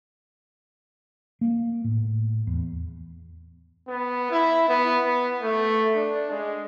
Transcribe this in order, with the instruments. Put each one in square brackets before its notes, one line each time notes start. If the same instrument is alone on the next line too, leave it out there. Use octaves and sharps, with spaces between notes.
[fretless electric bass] A#3
A2
E2
[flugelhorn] B3
E4
B3
B3
A3
D4
G#3